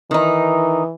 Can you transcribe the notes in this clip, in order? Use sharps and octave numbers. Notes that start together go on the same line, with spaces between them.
D#3 E3 D#4